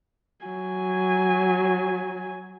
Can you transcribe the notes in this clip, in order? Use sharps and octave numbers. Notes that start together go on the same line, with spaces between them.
F#3 G#5